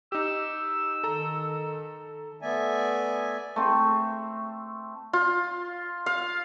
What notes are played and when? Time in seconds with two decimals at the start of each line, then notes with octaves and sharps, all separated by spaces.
0.12 D#4 G4 E6
1.04 D#3 A4 A#5
2.41 A3 B3 D5 E5 G#5
3.56 A3 C4
5.13 F4
6.06 F5